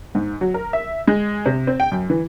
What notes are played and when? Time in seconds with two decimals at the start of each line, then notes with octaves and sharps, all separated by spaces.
0.15 G#2
0.41 F#3
0.54 A#4
0.73 E5
1.08 G#3
1.46 C3
1.67 C4
1.80 G5
1.91 F#2
2.10 E3